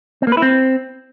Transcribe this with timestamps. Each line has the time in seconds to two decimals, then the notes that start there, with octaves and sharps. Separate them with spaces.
0.22 C4
0.27 A#3
0.32 B4
0.37 E4
0.42 C4